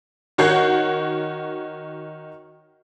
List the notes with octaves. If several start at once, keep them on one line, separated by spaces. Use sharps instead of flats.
D#3 F#4 C#5 F#5 G6 C7